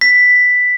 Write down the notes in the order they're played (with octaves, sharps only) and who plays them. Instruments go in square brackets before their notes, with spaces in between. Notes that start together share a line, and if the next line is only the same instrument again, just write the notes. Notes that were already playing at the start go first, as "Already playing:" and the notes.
[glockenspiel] B6